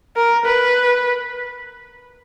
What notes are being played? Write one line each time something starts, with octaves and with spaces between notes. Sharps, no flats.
A#4
B4